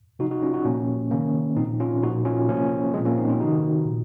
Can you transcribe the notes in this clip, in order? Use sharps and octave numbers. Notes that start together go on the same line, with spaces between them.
C3 F3 D#4 F#4
D#4 F#4
C#4 F4
D#4 F#4
A#2 F3 A#3 C#4
C3 D#3 A#3 C#4
A#2 F3 C4 D#4
C#4 F4
A#2 F3 D#4 F#4
C#4 F4
C3 F3 A#3 C#4
A#2 F3 G#3 C4
A#3 C#4
C4 D#4
C#4 F4
C3 D#3 D#4 F#4
A#2 F3